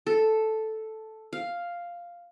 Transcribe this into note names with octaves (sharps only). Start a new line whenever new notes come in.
A4
F5